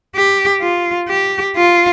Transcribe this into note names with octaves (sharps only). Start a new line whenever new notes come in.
G4
F4
G4
F4